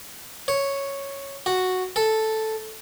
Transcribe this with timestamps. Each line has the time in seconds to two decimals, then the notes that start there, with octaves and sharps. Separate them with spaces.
0.48 C#5
1.46 F#4
1.96 A4